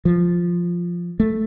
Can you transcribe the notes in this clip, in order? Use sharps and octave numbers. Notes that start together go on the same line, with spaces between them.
F3
A3